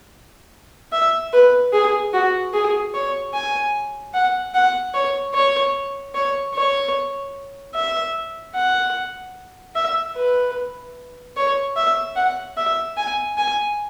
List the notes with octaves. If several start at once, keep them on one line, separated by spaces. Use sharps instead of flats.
E5
B4
G#4
F#4
G#4
C#5
G#5
F#5
F#5
C#5
C#5
C#5
C#5
E5
F#5
E5
B4
C#5
E5
F#5
E5
G#5
G#5